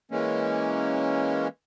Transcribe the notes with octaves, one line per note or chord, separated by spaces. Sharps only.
E3 G#3 A#3 C#4